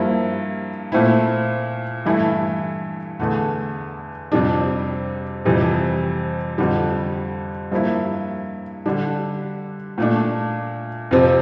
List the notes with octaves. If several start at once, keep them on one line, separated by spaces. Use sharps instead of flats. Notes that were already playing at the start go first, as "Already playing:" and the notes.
Already playing: G2 F3 A#3 E4
A#2 A3 C4 E4
G2 E3 A3 E4
E2 D3 A3
F2 C3 G3 D4
F2 C3 E3 G3
F2 D3 G3
G2 F3 A#3 E4
D3 G3 D4
A#2 A3 D4
F2 C3 F3 C4